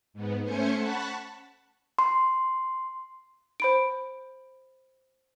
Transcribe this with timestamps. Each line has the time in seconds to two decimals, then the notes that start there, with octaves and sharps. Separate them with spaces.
0.13 G#2 B3
0.43 A3 C#4 C5 G#5 C#7
0.76 F#5 A5 B5 C#6 F#6
1.99 C6
3.60 C5 B5 D7